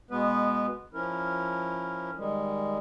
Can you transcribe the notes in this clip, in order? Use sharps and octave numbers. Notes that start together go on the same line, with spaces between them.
B2 G#3 B3 B4
F3 C#4 E4 A#4
D#3 G3 G#3